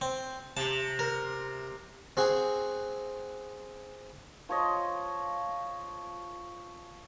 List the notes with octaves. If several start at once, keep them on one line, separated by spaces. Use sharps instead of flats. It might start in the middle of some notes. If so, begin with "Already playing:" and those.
C4
C3 A5
A#4
C4 F#4 G#4
F3 C#5 D#5